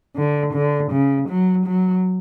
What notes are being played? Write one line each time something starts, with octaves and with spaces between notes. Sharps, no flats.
D3
D3
C#3
F#3
F#3